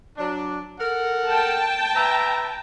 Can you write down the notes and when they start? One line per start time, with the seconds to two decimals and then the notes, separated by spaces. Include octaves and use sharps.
0.17 F#3 D4
0.78 A4 A#4 F#5
1.28 G5 A5
1.94 B4 E5 A#5